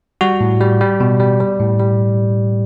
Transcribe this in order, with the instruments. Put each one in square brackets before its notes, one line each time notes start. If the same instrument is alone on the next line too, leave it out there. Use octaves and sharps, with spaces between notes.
[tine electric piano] G3 F#4
A2
G3
G3
B2
G3
G3
A2
G3